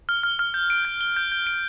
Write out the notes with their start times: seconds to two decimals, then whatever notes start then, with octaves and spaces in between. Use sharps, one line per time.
0.09 F6
0.23 F6
0.39 F6
0.54 G6
0.70 D7
0.85 G6
1.01 G7
1.17 G6
1.32 G6
1.47 D7